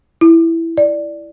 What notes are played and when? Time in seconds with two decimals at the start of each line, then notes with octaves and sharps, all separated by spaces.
0.21 E4
0.78 D5